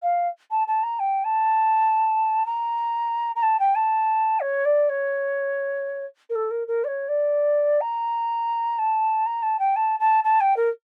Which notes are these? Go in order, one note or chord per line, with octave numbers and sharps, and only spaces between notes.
F5
A5
A5
A#5
G5
A5
A#5
A#5
A5
G5
A5
C#5
D5
C#5
A#4
A4
A#4
A#4
D5
C#5
D5
A#5
A5
A#5
A5
G5
A5
A5
A5
G5
A#4